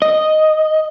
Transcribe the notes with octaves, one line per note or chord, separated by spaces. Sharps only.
D#5